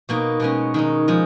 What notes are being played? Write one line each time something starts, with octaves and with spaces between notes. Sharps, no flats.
B2 A#3 D#4
B2 G#3 C#4
D#3 G#3 D#4
F3 G#3 D#4